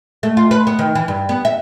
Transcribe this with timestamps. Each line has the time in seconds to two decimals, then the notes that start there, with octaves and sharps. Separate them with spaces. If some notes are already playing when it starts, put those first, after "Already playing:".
0.23 A3
0.37 F4
0.51 B4
0.67 B3
0.79 D#3
0.95 E3
1.08 G2
1.29 B3
1.45 E5